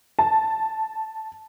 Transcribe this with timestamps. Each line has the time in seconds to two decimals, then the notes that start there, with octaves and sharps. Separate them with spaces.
0.19 A5